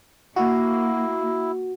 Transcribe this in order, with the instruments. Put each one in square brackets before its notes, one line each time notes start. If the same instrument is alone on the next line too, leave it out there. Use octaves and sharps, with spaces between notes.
[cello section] A#3 [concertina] E4 [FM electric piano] F#4